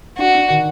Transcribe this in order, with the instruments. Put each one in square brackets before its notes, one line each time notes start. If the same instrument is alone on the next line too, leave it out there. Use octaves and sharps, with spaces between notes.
[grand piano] D4 [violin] F#4
[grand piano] D4
D#3